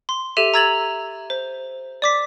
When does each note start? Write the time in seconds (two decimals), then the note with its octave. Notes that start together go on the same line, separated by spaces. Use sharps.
0.09 C6
0.37 G4 A4 E5 D#7 F7
0.54 A#5 E6 G#6 A6 F7 F#7
1.30 C5
2.02 D5 D6 B6